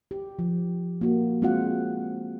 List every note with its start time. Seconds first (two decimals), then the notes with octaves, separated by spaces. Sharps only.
0.11 G4
0.39 F3
1.01 A#3 F#4
1.42 G#3 C4 F4 F#4 F5 F#5